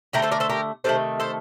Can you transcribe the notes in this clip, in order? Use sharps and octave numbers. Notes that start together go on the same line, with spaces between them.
D3 A3 G4 A#4
A4 C5
A#4 D5
A4 C5
G4 A#4
C3 D#3 A3 A4 C5
A4 C5